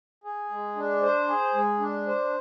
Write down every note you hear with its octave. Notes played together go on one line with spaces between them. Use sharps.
G#4
G#3
D4
C5
G#4
G#3
D4
C5